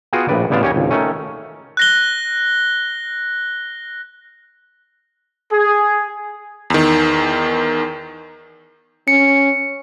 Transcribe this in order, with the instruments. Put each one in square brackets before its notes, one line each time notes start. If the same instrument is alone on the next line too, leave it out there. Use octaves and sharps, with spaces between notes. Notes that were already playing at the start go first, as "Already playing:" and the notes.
[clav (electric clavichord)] B3 F4 F#4 G#4 G5
A#1 A2 B4 D5
A1 D3 B3 D5 F5 A5
D#2 C#4 G4 C#5 D#5 G#5
G#1 C#2
D#3 A3 C#4
[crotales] F#6 A#6 G7
[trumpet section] G#4
[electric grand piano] E2 D#3
[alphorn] C#4 [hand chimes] C#7